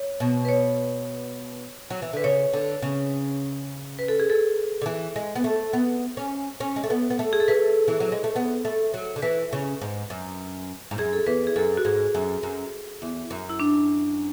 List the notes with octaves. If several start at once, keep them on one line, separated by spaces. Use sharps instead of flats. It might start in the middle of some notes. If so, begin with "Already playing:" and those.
Already playing: C#5
B2
B4
C#5
F#3
E3
D3 B4
C#3 C#5
D3
C#3
B4
A4
G#4
A4
D3
E3
G#3
B3
A3
B3
C#4
C#4
G#3
A3
B3
B3
A3
G#4
A4
A3 B4
E3
F#3
G#3
A3
B3
A3
F#3
D3
E3 B4
C#3
G#2
F#2
G#2
F#2 G#4
A4
E2 B4
G#4
F#2 A4
F#4
G#2 G#4
F#2
F#2
E2
F#2
E4
D4